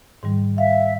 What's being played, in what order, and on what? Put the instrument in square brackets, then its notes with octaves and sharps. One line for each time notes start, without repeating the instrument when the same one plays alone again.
[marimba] G#2 D#3 G3
[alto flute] E5 [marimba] F5